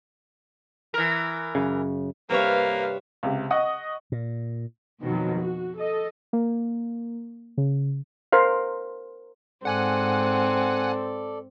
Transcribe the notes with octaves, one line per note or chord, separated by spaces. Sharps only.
E3 A#4
F#2 C#3
G2 C3 A#3 B4 C#5 F5
C#2 C3
D#5 F#5 C#6 D#6
A#2
F2 B2 D#3 F3 F#3
F#4
A4 D#5
A#3
C#3
A#4 C5 F5
G#2 C4 A4 D5 F#5 G#5 F#6